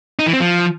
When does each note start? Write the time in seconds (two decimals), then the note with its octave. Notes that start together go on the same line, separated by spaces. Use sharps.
0.19 D#4
0.26 E3
0.33 C4
0.41 F3